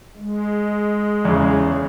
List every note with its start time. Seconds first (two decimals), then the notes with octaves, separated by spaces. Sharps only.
0.16 G#3
1.25 E2 C#3